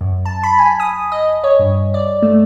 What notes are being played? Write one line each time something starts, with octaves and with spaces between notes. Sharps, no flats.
F#2
A5
B5
G#5
D#6
D#5
C#5
G2
D5
A3